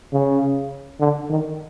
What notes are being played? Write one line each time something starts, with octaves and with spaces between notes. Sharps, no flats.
C#3
D3
D#3